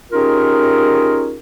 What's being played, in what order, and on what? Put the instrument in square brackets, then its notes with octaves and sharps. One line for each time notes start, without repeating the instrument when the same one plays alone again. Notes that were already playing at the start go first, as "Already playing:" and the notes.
[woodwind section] C#4 D#4 F4 G4 G#4 A#4